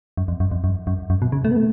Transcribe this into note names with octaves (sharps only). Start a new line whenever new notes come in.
F#2
F2
F#2
F2
F#2
F#2
F#2
B2
C#3
A3
B3
A3